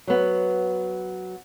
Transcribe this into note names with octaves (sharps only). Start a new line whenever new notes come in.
F#3 B3